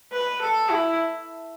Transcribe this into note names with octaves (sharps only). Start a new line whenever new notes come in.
B4
A4
E4